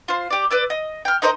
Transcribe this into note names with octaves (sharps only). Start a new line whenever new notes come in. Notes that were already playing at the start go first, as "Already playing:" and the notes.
F4 C5
G4 D5
B4 D5 E6
D#5
G5 F6
D#4 A#4 C5 D#5